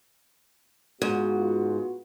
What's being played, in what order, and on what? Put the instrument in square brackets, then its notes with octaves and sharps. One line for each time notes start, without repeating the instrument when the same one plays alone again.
[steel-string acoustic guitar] G#2 [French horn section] B3 F4 F#4